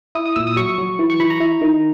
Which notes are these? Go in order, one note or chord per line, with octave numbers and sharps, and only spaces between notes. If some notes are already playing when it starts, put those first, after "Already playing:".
E4 D#6
D#6
A#2 E6
D#6
F#3 C#6
F#3
E3
C#6
E3 B5
A#5
E4
D#3